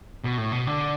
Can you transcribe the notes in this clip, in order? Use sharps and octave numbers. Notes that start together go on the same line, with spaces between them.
B2
A2
B2
D3